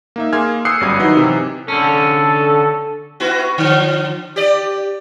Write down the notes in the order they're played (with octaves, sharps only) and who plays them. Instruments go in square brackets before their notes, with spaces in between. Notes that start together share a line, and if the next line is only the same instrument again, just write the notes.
[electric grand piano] A#3 D#4 E5
A#3 G#4 G#5 C6 F6 G#6
D#6 E6 F#6 G6 C7 C#7
G1 F#2 G3 D6 G#6
D#3 F#3 D#4 E4 B4 F#5
C3 E3
[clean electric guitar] D3 C#4 [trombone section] A4
[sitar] B3 E4 F#4
D3 F3
G4 D5